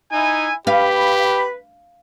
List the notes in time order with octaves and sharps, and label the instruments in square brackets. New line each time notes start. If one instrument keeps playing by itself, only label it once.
[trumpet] D#4 [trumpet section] E4 G#5
[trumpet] G4 [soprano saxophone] B4 [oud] F5 [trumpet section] B5